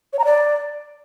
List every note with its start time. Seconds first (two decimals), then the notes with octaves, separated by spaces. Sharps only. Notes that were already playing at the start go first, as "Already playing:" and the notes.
0.13 C#5
0.19 A#5
0.25 D5